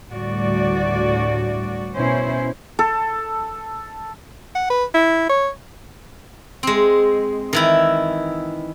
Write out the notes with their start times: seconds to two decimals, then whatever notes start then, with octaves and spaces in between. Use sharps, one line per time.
0.12 D2 A2 G3 F#4 D5
1.96 B2 C#4 E4 C5
2.79 A4
4.55 F#5
4.70 B4
4.94 E4
5.29 C#5
6.63 G#3 C4
7.53 D#3 E3 E4